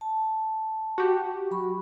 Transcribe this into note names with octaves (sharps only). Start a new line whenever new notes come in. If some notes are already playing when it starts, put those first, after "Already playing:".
A5
F#4 G4
F#3 B5 C#6